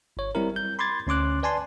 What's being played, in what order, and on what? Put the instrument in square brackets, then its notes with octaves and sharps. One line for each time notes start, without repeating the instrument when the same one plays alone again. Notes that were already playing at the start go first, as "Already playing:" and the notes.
[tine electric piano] G1 C#5
G3 C4 E4 A#4
G6
B5 C6 D6 G#6 A6
D2 C#4 C6 D6 F#6
B4 D5 G#5 A5 C6